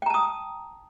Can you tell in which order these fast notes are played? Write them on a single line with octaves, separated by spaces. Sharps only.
G5 A#5 A5 D#6